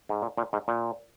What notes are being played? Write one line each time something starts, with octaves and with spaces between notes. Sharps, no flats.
G#2
A#2
A#2
G#2
A#2